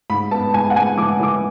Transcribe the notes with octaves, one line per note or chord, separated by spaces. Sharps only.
G#2 B5
B3 A5
G#2 G#5
F#5
G#2 G#5
E3 D6
E3 D6